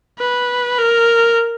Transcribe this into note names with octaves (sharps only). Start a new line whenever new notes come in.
B4
A#4